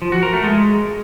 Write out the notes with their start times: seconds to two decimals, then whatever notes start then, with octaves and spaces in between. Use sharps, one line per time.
0.02 F3
0.12 F#4
0.23 A#4
0.33 A3
0.44 G#3